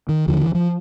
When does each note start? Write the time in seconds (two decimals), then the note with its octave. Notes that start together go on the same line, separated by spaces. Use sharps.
0.09 D#3
0.28 D#2 D3 F3
0.41 E3
0.55 F3